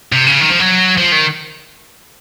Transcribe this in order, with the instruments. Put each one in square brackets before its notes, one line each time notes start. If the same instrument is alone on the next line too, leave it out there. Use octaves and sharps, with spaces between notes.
[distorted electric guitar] C3
C#3
D#3
F3
F#3
F3
D#3